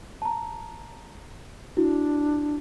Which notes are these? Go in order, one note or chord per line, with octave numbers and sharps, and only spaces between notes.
A5 A#5
D4 E4 F#4